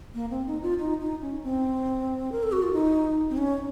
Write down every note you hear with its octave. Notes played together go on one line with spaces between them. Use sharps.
A#3
C4
D#4
F4
D#4
D#4
C#4
C4
A#4
A4
F#4
F4
D#4
C4
C#4